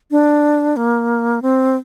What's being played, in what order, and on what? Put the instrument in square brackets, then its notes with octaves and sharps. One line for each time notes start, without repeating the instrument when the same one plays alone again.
[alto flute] D4
A#3
C4